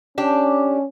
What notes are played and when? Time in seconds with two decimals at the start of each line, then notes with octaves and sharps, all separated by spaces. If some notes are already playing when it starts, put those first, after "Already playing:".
0.18 C#4 D4 G4